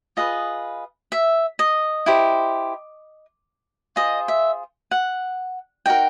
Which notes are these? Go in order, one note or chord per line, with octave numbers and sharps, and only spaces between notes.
F4 G#4 B4 D#5
E5
D#5
E4 G4 C5
F4 G#4 C5 D#5
E5
F#5
D#4 F#4 A#4 G5